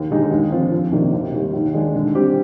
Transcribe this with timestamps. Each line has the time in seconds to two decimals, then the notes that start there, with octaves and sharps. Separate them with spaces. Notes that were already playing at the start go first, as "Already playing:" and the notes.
Already playing: D#2
0.11 D3 G#3 D#4 G4
0.31 D#2
0.52 D3 F3 C4 F4
0.72 F2
0.92 C3 D#3 A#3 D4
1.13 D#2
1.34 D#3 G3
1.54 D#2
1.74 D#3 G#3 D4
1.95 D3
2.15 G3 C4 G4